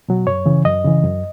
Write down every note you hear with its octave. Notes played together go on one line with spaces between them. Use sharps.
B2 F#3
F#2 C#5
C#3 E3
F#2 D#5
C#3 E3
F#2